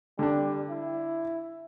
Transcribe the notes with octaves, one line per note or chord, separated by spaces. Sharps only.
D3 G3 D4
E4